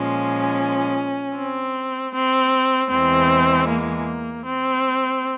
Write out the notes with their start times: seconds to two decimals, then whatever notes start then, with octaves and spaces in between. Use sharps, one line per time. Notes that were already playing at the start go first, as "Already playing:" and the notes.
Already playing: A#2 F3 G#3 C#4
1.35 C4
2.14 C4
2.90 E2 E3 G#3 C4
3.69 A#3
4.46 C4